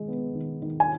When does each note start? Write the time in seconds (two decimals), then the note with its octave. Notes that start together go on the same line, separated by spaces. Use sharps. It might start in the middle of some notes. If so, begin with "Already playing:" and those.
Already playing: D#3 G#3
0.08 B3
0.35 D#3
0.62 D#3
0.80 G#5